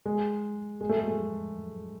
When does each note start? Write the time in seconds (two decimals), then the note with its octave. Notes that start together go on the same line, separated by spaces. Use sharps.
0.06 G#3
0.81 G#3
0.89 A3
0.99 G#3
1.08 A3